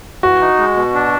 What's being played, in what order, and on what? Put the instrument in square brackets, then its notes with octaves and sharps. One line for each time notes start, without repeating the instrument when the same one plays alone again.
[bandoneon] E3 [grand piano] F#4
[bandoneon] D#4
G#3
B2
D4